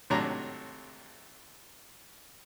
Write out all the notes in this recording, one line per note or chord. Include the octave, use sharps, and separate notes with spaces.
G#1 A2 C3 F#3 D4 A#5